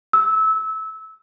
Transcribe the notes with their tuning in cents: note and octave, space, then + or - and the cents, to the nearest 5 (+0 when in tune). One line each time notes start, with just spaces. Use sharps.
E6 -20